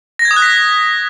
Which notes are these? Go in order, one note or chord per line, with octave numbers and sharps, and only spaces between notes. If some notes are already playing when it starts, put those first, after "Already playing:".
A#6
G#6
D#6
F#6
B6